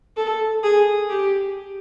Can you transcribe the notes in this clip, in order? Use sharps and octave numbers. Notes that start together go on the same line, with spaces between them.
A4
G#4
G4